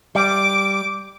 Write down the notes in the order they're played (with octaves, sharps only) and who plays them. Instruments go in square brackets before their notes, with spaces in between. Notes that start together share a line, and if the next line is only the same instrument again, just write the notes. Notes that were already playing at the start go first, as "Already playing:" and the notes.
[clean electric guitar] G3 [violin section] D6